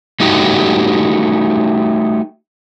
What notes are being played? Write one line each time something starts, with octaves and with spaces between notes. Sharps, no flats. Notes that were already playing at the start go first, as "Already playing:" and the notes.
G3 A3 D#4 F#4 G4